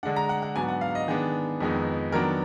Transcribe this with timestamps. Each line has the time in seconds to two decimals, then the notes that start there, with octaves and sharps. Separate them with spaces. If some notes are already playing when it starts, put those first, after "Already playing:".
0.03 D3 G#3 D4 F#5
0.16 A#5
0.29 F#5
0.42 F#5
0.55 G#2 F#3 B3 D4 G#5
0.68 F#5
0.81 F5
0.95 D#5
1.08 D#3 G#3 B3 D4 G#4
1.61 F2 D#3 G#3 B3 D#4
2.12 D#3 F#3 B3 D4 A#4